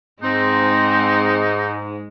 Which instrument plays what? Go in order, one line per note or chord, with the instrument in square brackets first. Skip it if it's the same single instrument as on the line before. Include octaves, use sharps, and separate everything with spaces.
[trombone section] G#2 [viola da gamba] G#3 [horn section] C4 [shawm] D#4